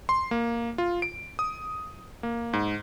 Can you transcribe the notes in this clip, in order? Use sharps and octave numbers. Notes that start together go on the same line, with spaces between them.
C6
A#3
F4
D7
D#6
A#3
G#2